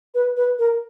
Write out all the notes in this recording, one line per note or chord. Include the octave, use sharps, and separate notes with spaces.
B4
B4
A#4